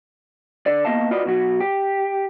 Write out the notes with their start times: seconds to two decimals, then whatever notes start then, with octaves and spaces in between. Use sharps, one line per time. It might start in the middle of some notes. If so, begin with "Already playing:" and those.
0.66 D3 D5
0.85 A#3 B3 C#4 D#5 F5 A5
1.11 F4 F#4 B4 D5 D#5
1.26 B2 F#3 F#4
1.60 G4